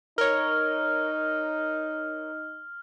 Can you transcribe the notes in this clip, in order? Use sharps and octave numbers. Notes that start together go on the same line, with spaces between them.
D#4 A#4 C#5 F6